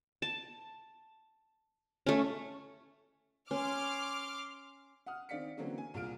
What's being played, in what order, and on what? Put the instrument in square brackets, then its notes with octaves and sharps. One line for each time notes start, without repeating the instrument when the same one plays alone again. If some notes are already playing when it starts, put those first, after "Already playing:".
[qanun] A5
A3 C#4
[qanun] C#4 [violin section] C6 D6 F6
[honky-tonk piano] F#5 D#6 F6
D#3 C4 D5 F5 B6 C#7
D3 E3 F#3 A#3 C4 C#4
G#5
C2 A#2 F4 G#4 F6 D7